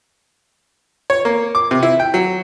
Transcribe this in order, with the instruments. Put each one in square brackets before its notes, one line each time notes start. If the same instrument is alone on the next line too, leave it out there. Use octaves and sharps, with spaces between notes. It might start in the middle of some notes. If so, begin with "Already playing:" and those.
[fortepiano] C#5
A#3
D6
C3
E4
G5
F#3